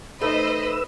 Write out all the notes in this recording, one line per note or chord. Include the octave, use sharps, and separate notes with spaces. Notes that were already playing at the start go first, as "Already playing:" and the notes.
A3 D#4 B4 C5 D#5 B5 E6